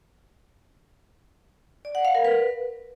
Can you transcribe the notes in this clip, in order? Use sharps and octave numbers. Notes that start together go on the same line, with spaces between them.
D5
F#5
F5
A#4
B4